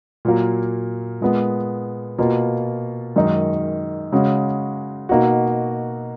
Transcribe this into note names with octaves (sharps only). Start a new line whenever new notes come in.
A#2 F#3 A#3
A#2 G#3 B3
B2 A#3 F4
F#2 D#3 G#3 D#4
C#3 G#3 C#4 F#4
B2 A#3 D#4 F#4